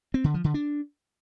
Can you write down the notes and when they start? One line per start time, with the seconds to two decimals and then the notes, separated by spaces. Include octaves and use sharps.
0.14 C4
0.24 D3
0.34 F3
0.44 D3
0.54 D4